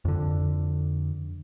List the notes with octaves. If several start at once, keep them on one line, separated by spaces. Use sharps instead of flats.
F2 D3